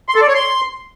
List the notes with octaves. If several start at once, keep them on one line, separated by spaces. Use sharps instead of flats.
C6
A4
D5
C#5
C6